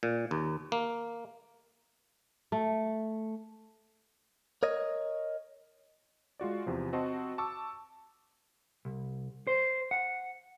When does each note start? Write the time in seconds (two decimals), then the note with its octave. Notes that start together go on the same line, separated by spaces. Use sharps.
0.03 A#2
0.31 D#2
0.72 A#3
2.52 A3
4.63 A#4 C#5 D#5
6.40 G#3 F4 F#4 D5
6.66 E2 C3 F3
6.93 C4 F#4 D#5 A5 C6
7.38 A5 C#6 D6 E6
8.85 C2
9.47 C5
9.91 F#5